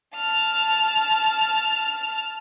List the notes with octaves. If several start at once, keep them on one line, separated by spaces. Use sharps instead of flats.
A5 F6